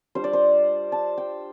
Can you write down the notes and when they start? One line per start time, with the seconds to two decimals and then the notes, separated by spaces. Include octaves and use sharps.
0.15 G3 D4 F4 C5
0.24 D5
0.33 C5
0.92 A5
1.18 G5